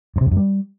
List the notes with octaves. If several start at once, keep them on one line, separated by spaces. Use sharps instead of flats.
G2
C3
F2
F#2
G3